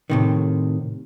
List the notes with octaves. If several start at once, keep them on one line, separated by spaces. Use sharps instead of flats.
A2 C3 D#3